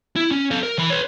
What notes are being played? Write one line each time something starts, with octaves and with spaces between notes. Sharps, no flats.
E4
C#4
A4 F5
A#4
E3 B5
B4 C#5